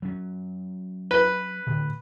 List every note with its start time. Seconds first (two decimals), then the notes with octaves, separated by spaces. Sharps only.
0.02 F#3 C#4
1.11 B4
1.67 D2 A2 D3